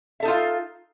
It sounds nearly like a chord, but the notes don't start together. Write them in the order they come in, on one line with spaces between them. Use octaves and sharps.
E5 A4 D#4 F4 F5